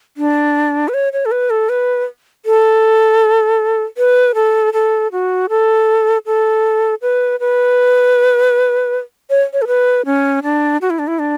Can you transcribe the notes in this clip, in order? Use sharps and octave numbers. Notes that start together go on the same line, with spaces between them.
D4
B4
C#5
C#5
A4
B4
A4
B4
A4
B4
A4
A4
F#4
A4
A4
B4
B4
C#5
C#5
A4
B4
C#4
D4
F#4
E4
D4
E4
D4